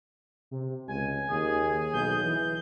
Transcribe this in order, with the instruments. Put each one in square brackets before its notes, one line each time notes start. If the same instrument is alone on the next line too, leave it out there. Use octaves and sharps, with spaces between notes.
[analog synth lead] C3
[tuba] C#2 [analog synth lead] G#5
[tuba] D#2 [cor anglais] G#4
[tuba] B1 [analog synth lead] G6
[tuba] E3